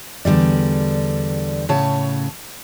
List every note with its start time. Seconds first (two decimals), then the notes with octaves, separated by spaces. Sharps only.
0.25 E2 D3 G3 D5
1.69 A2 C#3 C#5 A5